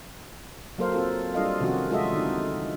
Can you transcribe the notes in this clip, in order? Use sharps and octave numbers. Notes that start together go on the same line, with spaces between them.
F#3 A#3 A4 A#4 C5 F5
C4 F4 A4
G3 D4 F4 A4 D#5 F5
C3 D#3 F3 C#4 F#4
G#3 F4 F#4 A4 D#5 E5
D3 D#4